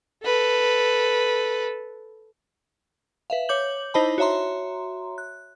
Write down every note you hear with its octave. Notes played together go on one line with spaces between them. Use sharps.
A4 B4
B4 E5 F5
C#5 D6 G6 F#7
D#4 E4 C5 D#5 A5 B5
F#4 C#5 E5 A#5 C6
F#6